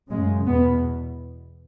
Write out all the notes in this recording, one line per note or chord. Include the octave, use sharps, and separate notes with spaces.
F#2 C#3 G#3
E2 B2 B3